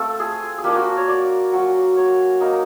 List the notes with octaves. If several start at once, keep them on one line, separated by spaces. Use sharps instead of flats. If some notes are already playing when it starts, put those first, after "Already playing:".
Already playing: A3 C4 F4 A4
G#4
G#4
A#3 D4 F4 G4
F#4
C#5
D5
F#3 A#3 C#4
C#5
A#3 D#4